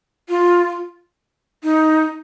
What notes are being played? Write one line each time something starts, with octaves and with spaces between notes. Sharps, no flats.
F4
D#4